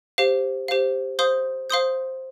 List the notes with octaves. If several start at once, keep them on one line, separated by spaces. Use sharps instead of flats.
G4 C5 F5
G4 C5 F5
C5 F5 C6 D#6 G6
C5 F5 C6 D#6 G6